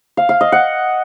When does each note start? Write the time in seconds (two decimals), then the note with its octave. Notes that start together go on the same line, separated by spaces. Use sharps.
0.17 F5
0.29 F5
0.41 D#5
0.52 F#5